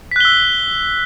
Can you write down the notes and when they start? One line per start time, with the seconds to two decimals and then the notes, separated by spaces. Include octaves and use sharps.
0.11 B6
0.16 F#6
0.20 G7
0.25 E6